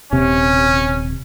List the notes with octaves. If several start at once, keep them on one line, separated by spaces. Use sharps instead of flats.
D#1 C3 C#4